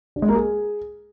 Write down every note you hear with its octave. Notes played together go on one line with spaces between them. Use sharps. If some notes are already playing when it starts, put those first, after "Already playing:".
D4
G#3
A#3
G#4